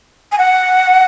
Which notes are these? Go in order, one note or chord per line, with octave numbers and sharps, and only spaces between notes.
G#5
F#5